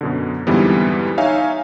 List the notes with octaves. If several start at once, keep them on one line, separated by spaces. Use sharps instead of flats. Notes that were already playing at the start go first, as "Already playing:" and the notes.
F#2 B2 D3
F2 G#2 D3 E3 G3 B3
D#4 C#5 E5 F5 G#5